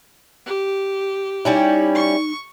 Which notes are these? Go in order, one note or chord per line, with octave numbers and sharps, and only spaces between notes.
G4
G3 C#4 D#4 E4
C#6